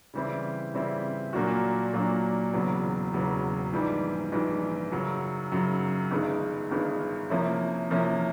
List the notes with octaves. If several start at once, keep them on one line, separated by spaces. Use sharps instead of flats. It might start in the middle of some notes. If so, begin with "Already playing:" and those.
C#3 E3 G3 C4 E4
C#3 E3 G3 C4 E4
A#2 F#3 A#3 D4 F#4
A#2 F#3 A#3 D4 F#4
E1 E2 C#3 F#3
E1 E2 C#3 F#3
A#1 G#2 E3 G3
A#1 G#2 E3 G3
F#2 C#3 F#3
F#2 C#3 F#3
G1 G2 D#3 G#3
G1 G2 D#3 G#3
C3 F3 A#3 C#4 E4
C3 F3 A#3 C#4 E4